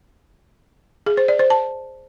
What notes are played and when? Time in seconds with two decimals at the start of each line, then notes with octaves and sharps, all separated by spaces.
1.06 G#4
1.17 C5
1.28 D5
1.39 C5
1.50 A5